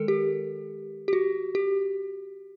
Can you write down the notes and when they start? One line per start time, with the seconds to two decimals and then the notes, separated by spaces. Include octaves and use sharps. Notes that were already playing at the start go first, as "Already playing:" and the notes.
Already playing: D#3 G#3 A4 A#4
0.08 G4
1.08 G4
1.13 F#4
1.55 G4